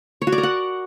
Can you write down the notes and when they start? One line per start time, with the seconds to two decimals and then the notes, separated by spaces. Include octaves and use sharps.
0.22 C#5
0.27 F#4
0.32 D5
0.38 A#4
0.43 F#5